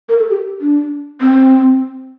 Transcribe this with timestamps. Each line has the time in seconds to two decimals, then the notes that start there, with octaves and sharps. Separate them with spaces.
0.09 A#4
0.20 A4
0.30 G4
0.61 D4
1.21 C4